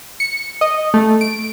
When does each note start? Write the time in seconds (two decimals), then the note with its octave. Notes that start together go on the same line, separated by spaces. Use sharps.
0.20 C#7
0.61 D#5
0.94 A3
1.21 D7